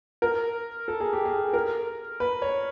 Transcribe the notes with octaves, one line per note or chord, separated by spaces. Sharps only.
A#4
A4
G#4
G4
G#4
A#4
B4
C#5